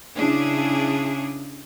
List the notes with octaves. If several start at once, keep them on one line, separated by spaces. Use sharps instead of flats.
C#3 D4 E4 G#4